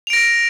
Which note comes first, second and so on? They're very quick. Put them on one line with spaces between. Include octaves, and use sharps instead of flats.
F7 D7 A#6